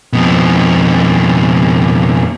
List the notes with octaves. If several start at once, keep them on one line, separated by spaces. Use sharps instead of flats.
F2 B2